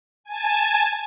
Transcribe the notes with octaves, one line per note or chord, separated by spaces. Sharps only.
G#5 A5